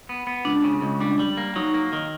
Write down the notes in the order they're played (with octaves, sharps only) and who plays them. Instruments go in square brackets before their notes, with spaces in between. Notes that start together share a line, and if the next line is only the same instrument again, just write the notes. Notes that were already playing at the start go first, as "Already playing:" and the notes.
[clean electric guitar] B3
B3
[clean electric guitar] C#2 [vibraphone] D4
[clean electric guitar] C#3
C#2
[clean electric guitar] G3 [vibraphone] D4
[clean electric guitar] G3
A#3
[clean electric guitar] F#3 [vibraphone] D#4
[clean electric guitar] A#3
D#3